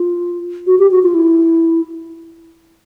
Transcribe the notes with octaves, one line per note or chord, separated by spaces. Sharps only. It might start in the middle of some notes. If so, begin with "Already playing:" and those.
Already playing: F4
F#4
G4
F#4
F4
E4